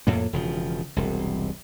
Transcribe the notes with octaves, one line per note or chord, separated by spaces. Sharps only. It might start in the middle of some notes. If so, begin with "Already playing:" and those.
F2 A2 A#3
E1 C#3 F3
E1 C2